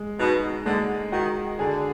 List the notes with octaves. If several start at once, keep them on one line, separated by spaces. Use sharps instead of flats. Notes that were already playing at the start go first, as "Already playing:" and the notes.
Already playing: G#3
B2 D#4
D3 G#3
D#3 F#4
D3 G#4